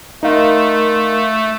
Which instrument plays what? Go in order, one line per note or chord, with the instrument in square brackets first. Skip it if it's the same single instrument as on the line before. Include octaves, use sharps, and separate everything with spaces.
[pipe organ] A3 [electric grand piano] D#4 F5 [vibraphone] A#4 C6